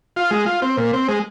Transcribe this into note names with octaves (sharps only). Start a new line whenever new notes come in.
F4
G#3
F4
C4
A#2
C4
G#3